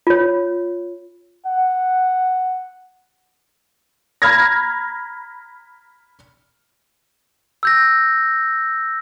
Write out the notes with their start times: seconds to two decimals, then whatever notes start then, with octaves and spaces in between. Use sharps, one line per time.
0.07 F4 C#5
1.46 F#5
4.22 A#5 B5 F6 G#6 A#6
7.63 E6 G6 A#6